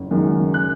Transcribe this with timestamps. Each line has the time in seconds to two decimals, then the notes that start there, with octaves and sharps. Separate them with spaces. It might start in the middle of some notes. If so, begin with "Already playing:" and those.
Already playing: F#1
0.11 F#2 D#3 G#3
0.54 F#6